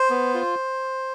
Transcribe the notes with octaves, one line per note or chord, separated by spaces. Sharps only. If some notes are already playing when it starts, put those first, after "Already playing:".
Already playing: C5
B3
F4